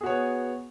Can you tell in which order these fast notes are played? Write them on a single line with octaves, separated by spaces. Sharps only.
G#4 F#4 C#5 B3